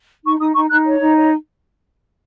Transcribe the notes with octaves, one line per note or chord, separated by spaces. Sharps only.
D#4 C#6
D#4 D#6
D#4 C#6
D#4 F#6
C#5
D#4
C#5